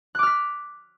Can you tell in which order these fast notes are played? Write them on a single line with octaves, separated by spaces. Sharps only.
F#6 D6 F6 B6